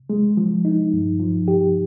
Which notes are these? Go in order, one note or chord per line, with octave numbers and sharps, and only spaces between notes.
G#3
F3
D#4
G2
F3
G4